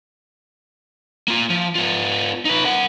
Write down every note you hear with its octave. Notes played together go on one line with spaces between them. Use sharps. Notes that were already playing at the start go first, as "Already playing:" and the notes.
A#3 F4
F3
B3 F4
D#4 B4
A#4 F#5